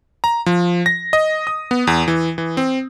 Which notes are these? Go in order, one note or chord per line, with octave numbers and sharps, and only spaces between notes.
A#5
F3
A#6
D#5
D#6
B3
E2
E3
E3
C4